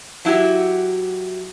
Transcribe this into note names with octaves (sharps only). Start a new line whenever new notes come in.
F#3 E4 F#4 G4